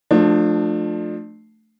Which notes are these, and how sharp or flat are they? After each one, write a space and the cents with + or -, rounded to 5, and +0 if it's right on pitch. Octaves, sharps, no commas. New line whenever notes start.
F3 +20 A3 +0 D4 +30